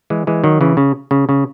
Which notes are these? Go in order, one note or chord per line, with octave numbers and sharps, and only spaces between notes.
E3 G#3
E3 G#3
D#3 F#3
C#3 E3
C#3
C#3
C#3